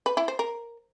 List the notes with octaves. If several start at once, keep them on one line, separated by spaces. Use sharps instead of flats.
B4
E4
C5
A#4